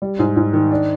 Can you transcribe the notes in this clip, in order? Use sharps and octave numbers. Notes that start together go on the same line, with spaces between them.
G3
G#2
G#2
D#3
D4